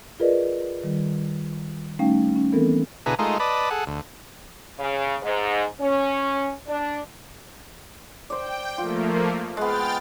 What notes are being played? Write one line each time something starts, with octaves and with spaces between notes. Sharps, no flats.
F4 G#4 A#4 B4 D5 D#5
D#3 G3
G3 A3 C#4 D#4 F5 G5
C#4
E3 B3 C4 A4 A#4
B2 D3 E4 G#4 B4 A#5
G#3 A3 D#4 F4 A#4
B4 D5 D#5 A5 B5
G#4 A4 F#5
D2
C#3
G#2
C#4
D4
C5 D5 G5
F3 A3 A#3 F4
G#3 B3 G5 F6 A6